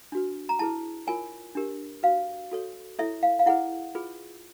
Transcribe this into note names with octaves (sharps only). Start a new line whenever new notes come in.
D4 F#4 B4
A#5
E4 G#4 B4 A5
F4 A#4 C#5 G#5
D4 G4 A#4
F#4 B4 F5
F#4 A4 C#5
E4 A4 C#5 E5
F5
F5
E4 G#4 B4 F#5
F4 G#4 B4